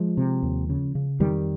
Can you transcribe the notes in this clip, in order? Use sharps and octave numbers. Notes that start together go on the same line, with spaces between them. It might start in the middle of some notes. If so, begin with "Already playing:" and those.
Already playing: F3 G#3
C3
D#2
C#3
C#3
F2 D#3 G3